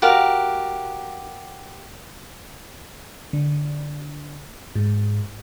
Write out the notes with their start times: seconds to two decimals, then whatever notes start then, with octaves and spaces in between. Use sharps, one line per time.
0.02 F#4 G4 A#4 F5
3.33 D3
4.76 G#2